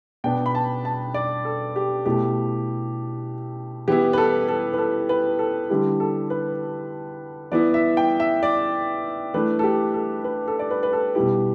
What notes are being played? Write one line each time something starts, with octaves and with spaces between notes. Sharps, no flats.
B2 B3 D4 G5
B5
A5
A5
D5
A4
G4
B2 A3 E4 G4
E3 B3 E4 G4
B4
A4
A4
B4
A4
B4
A4
D3 G3 E4 G4
A4
B4
E3 B3 E4 D5
E5
G5
E5
D5
E3 A3 D4 B4
A4
G4
A4
B4
A4
D5
B4
B4
A4
B2 G3 E4 G4